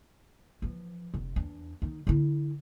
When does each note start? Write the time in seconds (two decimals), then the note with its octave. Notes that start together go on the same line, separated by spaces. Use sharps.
0.62 E3 F3
1.14 F1
1.36 E2 D4
1.82 D#3 D#4
2.07 D3 E4